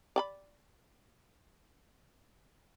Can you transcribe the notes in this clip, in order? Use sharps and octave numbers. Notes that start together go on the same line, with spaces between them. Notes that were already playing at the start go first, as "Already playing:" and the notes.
D5 G5 B5